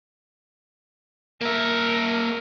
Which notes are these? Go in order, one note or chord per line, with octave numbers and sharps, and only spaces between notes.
A#3 A#4 E5